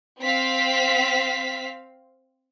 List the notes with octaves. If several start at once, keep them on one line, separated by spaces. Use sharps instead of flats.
C4 F5 B6